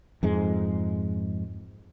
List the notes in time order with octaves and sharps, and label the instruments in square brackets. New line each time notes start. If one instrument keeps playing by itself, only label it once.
[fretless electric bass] F2 G#2 G#3